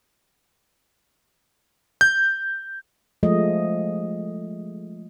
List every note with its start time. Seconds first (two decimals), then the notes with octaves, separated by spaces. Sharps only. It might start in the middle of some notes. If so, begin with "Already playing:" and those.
2.01 G6
3.23 F3 G#3 A3 D#5